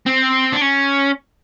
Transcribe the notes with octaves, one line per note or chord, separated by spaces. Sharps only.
C4
D4
C#4